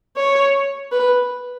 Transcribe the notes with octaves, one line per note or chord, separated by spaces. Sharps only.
C#5
B4